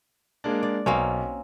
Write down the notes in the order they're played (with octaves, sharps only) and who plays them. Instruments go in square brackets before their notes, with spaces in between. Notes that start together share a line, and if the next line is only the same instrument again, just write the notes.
[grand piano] G#3 A#3 D4
[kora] D5
[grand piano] B1 [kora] A#3 C4 C#4